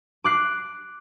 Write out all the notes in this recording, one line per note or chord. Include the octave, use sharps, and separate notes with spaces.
D6 F#6 C7